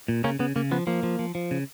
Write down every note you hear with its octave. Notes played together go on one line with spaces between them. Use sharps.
A#2
C#3 A#3 C#4
C#3 B3
C#3 A#3
F3 B3
F3 A#3
F3
F3
F3
C#3